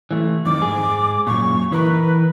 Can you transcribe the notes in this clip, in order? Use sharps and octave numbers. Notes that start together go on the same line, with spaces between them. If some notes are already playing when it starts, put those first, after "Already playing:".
E3 A3
F2 D#3 D6
G#2 G#4
F#2 A#2 C#6
E3 A#4 B4